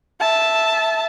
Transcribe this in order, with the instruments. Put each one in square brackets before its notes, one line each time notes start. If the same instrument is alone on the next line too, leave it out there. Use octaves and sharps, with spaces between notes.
[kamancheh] E5 A5